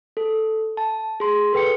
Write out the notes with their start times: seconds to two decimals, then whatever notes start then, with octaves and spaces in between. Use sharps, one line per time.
0.17 A4
0.77 A5
1.20 G#4 C6
1.53 A4 B4 G5 C#7